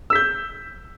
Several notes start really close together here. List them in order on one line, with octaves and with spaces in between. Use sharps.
E6 B6 G6